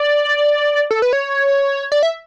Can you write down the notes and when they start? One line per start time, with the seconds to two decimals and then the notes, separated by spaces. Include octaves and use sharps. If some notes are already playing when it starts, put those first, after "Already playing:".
Already playing: D5
0.91 A4
1.02 B4
1.13 C#5
1.92 D5
2.03 E5